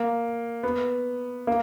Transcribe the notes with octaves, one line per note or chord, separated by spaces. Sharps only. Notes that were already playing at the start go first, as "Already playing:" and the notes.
Already playing: A#3
B3
A#3